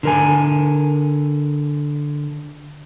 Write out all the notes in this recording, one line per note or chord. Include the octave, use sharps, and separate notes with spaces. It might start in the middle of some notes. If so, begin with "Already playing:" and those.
D3 A#4 G#5